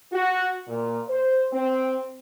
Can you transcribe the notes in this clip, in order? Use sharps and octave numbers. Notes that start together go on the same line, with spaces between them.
F#4
A#2
C5
C4